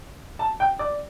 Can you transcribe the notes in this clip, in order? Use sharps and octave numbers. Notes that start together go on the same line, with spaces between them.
A5
G5
D5